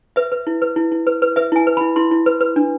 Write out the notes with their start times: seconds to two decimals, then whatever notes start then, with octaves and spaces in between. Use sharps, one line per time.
0.16 B4 E5
0.32 B4
0.47 E4
0.62 B4
0.76 E4
0.92 E4
1.07 B4
1.22 B4
1.36 B4 E5
1.52 E4 G#5
1.67 B4
1.77 E4 B5
1.96 E4 C6
2.11 E4
2.26 B4
2.41 B4
2.56 D4